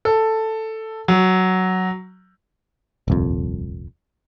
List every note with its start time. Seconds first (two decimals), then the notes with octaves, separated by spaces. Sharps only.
0.05 A4
1.08 F#3
3.08 D#1 C2 F2